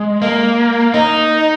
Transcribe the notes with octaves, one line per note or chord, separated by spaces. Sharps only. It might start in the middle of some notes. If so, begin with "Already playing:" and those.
Already playing: G#3
A#3
D#4